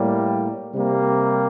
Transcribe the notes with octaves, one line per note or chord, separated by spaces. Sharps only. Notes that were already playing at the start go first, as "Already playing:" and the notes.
Already playing: A2 G3 A#3
C3 G3 A#3